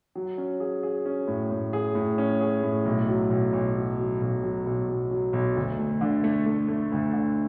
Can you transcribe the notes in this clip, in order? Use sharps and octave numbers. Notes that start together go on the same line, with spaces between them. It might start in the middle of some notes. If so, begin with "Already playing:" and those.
F#3
C#4
G#4
G#4
C#4
A2
A2
G#4
A2
C#4
G#4
A2
B1
F#3
B1
B1
F#3
F#3
B1
F#3
B1
B1
F#3
B1
D2
A3
D3
A3
A3
A3
D2
D3